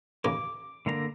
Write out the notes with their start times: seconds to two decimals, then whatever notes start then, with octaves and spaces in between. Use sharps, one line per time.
0.24 A1 D#2 C#3 D6
0.86 D3 A#3 A#5